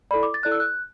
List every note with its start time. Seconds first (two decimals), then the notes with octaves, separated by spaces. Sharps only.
0.11 E4 A4 D5 B5
0.23 D6
0.34 A6
0.43 E4 A4 D5 F#6
0.52 E6
0.60 F#6